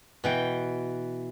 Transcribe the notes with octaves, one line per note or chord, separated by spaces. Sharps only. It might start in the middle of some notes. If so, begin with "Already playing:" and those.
B2 E3 G5